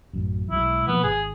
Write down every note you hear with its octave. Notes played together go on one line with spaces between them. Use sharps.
A1 F#2
B1 F3 G#3 E4
B2 F3 A#3 B3
G#1 G#4